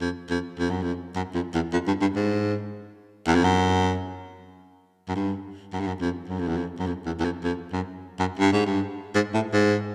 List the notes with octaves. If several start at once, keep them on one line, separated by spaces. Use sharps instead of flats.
F2
F2
F2
F#2
F2
F#2
F2
E2
F2
G2
G2
G#2
E2
F2
F#2
F#2
G2
F#2
G2
F#2
F2
F#2
F2
E2
F2
F#2
F2
E2
E2
F2
F2
F#2
F#2
G2
G#2
G2
G#2
A2
G#2